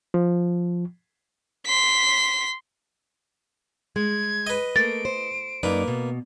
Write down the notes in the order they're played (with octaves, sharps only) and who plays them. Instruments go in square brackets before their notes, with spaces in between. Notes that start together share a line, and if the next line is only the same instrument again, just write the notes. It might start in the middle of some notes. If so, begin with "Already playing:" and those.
[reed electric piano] F3
[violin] C6 B6
[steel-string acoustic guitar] G#3 [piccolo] G#6
[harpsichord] B4 D#5
[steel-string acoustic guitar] A3 A#3 [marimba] A6 [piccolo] D7
[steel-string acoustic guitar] C5
[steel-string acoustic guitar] F#2 D#4 D5 [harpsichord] A#3 B4
[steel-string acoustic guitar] B2